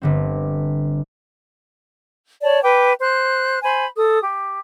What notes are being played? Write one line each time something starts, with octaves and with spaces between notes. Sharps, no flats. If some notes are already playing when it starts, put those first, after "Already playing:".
G1 D3 C4
C#5 D5 A5
B4 G5 D6
C5 F#6
C5 G#5 B5
A4 D#6
G4